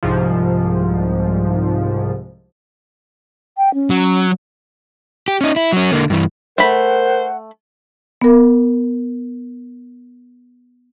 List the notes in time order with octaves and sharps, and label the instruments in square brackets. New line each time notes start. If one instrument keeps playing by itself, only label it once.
[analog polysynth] C2 G#2 F3
[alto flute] G5
C#4
[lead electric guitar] F#3
[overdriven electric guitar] G4
C#4 D#4
E4
F#3 C#4
D3 A#3
G2 E3
[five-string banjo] A3 B5 [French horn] A#4 [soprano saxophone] C5 [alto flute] F#5
[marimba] B3 A#4